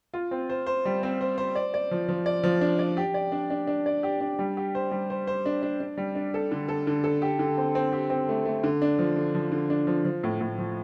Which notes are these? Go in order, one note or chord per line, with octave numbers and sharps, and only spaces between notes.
F4
C4
C5
C5
G3
C4
C5
C5
D5
D5
F3
F3
D5
F3
D4
D5
G4
D5
D4
D4
D4
D5
G4
D4
G3
G4
C5
G3
C5
C5
D4
D4
D4
G3
D4
A4
D3
A4
D3
A4
G4
D3
C4
C4
G4
C4
A3
A3
D3
D4
F3
D3
F3
D3
D4
F3
F3
A2
A2
F3